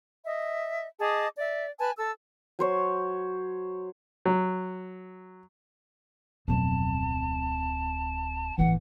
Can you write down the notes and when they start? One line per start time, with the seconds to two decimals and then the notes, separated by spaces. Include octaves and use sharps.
0.25 D#5 E5
0.99 G#4 D#5 A5 D6
1.37 D5 E5
1.79 B4 G#5 A5
1.98 A4 A5 E6
2.59 F#3 C5 C#5
4.25 F#3
6.48 D1 F2 B2 F#3 C4 A5
8.58 G1 A2 E3 F#5